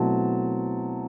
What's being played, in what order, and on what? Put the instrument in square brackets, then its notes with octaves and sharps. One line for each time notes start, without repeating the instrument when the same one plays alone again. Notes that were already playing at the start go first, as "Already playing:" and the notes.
Already playing: [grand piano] B2 F#3 A3 C4 E4 A5